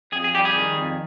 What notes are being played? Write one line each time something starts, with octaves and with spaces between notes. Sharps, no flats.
F2 G#4
G#4
G3 G4
G#4
D#3
F2